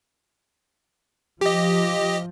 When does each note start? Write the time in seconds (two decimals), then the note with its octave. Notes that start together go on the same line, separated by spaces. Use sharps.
1.41 F3 G4 D#5